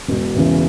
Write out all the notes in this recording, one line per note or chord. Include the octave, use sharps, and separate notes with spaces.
E1
E2 C#3 E3